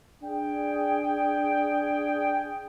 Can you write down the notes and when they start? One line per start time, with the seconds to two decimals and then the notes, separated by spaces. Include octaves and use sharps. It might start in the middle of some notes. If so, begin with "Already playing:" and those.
0.23 D4 G#4 G5